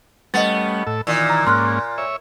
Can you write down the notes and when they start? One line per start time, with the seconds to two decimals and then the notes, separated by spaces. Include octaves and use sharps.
0.34 G3 A3 B3 C#4 D#5 F#5 A6
0.87 A2 A4 E6
1.07 A#2 D#3 E3 E6
1.30 A#5
1.47 G#2 A#3 C#4 C6 F6 F#6
1.98 C#5 E5